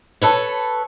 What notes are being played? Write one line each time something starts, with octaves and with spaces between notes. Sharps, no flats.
A4 B4 C#5